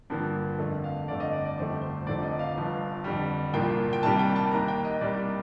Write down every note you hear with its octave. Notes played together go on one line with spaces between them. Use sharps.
G2 D3 F3 A#3
F2 D3 A3
F5
G1 F2 D3 A3 D5
D#5
D5
D5
G1 F2 D3 A3 C5
C5
F1 F2 D3 F3 A3 D5
D#5
F5
G1 G2 F3
F2 D3 G3
C2 A#2 F3 A#3 G5
G5
C2 C3 D#3 G3 A#3 A5
G5
A5
D#2 D#3 A#3 A#5
G5
D#5
C2 C3 G3 A#3 D5